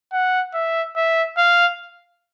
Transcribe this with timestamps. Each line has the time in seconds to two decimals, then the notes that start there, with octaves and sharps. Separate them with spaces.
0.13 F#5
0.54 E5
0.96 E5
1.37 F5